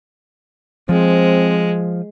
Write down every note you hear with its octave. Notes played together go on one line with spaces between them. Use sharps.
F3 G#3 C4